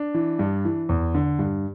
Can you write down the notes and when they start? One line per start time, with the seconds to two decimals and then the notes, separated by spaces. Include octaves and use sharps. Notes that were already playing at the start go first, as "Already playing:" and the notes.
Already playing: D4
0.14 E3
0.39 G2
0.65 E3
0.89 E2
1.14 D3
1.39 G2